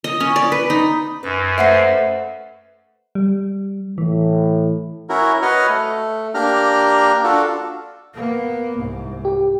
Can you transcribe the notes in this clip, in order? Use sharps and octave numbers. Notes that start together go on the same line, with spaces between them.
D#5
C#4
D5
B4
D#4
F#2 B4
A3 B4 C5 E5 F#5 C7
G3
A2 E3
C#4 E4 F#4 A#4
F#4 B4 C#5 D#5 F#5 F6
A3
A#3 D4 G4 A#5 F6
D4 F4 F#4 A4
A#3 B3
C2 G#2
G4